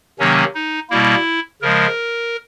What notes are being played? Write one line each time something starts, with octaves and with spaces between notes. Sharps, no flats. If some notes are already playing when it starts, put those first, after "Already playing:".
C3 D#3 F#3 A#3 C#4
D#4
B2 G3 A#3 E4
C#3 F3 G#3 A#4